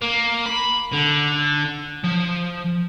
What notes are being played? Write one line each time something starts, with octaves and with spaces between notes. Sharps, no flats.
A#3
B5
D3
F3